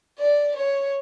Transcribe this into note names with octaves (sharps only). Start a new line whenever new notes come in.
D5
C#5